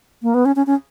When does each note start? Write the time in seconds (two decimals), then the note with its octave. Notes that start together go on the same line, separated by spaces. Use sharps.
0.23 A#3
0.34 B3
0.45 C#4
0.56 C#4
0.67 C#4